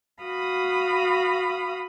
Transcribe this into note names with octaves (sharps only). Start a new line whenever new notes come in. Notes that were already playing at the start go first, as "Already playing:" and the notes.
F#4 F5 B5 D#6